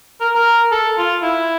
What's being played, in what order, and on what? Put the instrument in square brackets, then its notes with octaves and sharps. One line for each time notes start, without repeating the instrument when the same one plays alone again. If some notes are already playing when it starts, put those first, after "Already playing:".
[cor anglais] A#4
A#4
A4
F4
E4